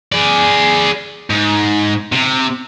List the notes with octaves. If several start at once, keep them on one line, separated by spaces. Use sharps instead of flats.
G#4 D5
G#2
C3